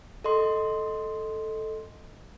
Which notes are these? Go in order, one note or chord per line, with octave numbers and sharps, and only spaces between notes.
A4 D#5 C6